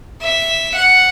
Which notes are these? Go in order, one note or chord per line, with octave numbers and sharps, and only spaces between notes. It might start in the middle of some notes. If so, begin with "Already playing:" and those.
E5
F#5